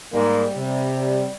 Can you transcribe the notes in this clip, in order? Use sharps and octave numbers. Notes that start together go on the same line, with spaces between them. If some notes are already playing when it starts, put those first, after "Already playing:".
G#2 G3 A#3
C3